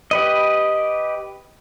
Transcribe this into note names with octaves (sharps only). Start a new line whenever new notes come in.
G4 B4 D#5